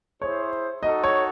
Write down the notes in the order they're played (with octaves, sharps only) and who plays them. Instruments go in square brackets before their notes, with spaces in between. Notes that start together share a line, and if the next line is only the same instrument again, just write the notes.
[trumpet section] E4 G#4 C5 [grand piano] C#5
[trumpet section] D#4 F#4 A4 [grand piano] D#5
[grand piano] C#5